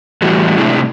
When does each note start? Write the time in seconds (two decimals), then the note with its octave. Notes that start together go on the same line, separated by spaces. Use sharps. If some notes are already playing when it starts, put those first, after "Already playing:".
0.22 A2 E3 G3 F#4
0.58 A2 C3 G#3 D4 E4